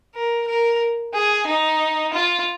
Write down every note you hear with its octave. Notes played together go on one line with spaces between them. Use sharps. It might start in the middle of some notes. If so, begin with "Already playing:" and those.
A#4
A#4
G#4
D#4
F4